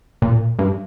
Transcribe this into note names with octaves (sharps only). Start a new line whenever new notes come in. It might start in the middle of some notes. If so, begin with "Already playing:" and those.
A#2
G2